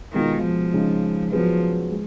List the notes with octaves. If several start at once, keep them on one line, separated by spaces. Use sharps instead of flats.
B2 D#3 G#3 B3 F4
F3
C#3 G#3 D#4
F3 F#3 B3 F4 G#4 B4
G#3